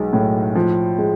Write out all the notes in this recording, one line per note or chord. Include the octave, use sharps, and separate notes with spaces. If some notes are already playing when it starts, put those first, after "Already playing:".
Already playing: B1 G#3
A2
F3
G#3